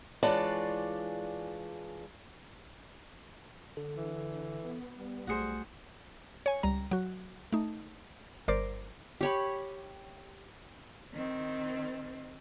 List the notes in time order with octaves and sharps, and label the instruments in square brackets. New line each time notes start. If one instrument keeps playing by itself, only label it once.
[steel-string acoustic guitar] E3 G#3 D4 F4 C#5 D5
[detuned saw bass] D3 [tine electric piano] A4
[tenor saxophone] E3
[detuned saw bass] B3
[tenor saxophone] G3
[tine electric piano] B1 A3 C#7 [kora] F#4 G#4 C5
[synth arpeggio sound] C#5 G#5
C#2 G3 A#5
F#3 F#4
A3 D#4
G1 A#4 C5 D5 D6
[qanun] G4 C#5 B5
[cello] D#3 C4